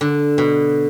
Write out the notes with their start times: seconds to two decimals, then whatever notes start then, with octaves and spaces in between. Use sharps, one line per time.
0.01 D3
0.38 B2